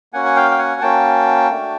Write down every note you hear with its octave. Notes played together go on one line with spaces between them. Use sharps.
A#3 C#4 F#4 F#5 G#5
G#5
F5 G5
G5
F#5 G#5
A#3 C#4 F#4 G5 A5
A3 D4 F#4